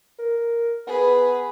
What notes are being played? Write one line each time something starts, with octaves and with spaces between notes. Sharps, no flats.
A#4
B3 G#4 B4